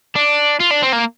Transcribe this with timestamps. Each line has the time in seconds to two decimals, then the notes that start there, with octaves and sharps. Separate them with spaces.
0.16 D4
0.60 F4
0.71 D4
0.83 C4
0.93 A#3